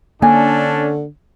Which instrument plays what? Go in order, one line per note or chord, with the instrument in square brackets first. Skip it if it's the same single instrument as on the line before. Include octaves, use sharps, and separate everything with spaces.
[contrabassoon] D3 [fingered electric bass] A#3 [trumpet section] C#4 D4 A4 [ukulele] G#5